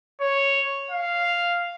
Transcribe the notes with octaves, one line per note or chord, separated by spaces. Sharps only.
C#5
F5